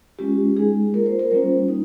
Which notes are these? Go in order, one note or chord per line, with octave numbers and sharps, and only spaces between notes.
G#3 C#4 F4 G4
G#3 D#4 G#4
A#3 F4 A#4
C5
A#4
G3 A#3 C#4 F4 C5
D#4